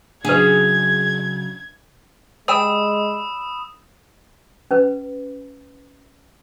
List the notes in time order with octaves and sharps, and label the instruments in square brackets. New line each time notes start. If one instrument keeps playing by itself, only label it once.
[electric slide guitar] C#3 F#3 [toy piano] D4 B4 [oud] G#4 [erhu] G#6
[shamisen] G3 G5 G#5 [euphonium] G#3 [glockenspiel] B5 E6 E7 [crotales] D#6
[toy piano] C#4 B4